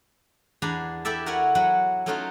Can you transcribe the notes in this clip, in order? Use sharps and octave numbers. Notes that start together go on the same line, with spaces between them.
E2 D4 G#5 A#5 B5
E4 G4 A4 D5 E5
F#4 A#4 B4 C#5 E5 F#5
F#3 B4 F#5
F#3 A3 C#4 D#4 F4 F#4